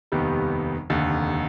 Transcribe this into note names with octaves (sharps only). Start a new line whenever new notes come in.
F1 D#2 D#3 G3 B3
F1 D#2 D3